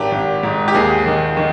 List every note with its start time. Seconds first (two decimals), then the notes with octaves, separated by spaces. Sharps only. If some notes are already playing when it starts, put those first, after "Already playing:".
Already playing: G#1 G4
0.11 G#1
0.43 G#2
0.68 G4
0.74 D#2 G#4
1.06 D#3
1.37 D#3